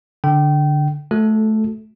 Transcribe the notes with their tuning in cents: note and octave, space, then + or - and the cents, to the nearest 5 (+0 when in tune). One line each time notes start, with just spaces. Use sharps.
D3 +0 G5 -25
A3 -20 F#4 -20 A4 +0